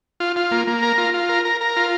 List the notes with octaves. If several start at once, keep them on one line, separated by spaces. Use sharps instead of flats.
F4
F4
A#3
A#3
A#4
F4
F4
A#4
A#4
A#4
F4